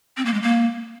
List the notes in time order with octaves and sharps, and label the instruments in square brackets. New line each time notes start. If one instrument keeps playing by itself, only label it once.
[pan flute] C4
A#3
G#3
A#3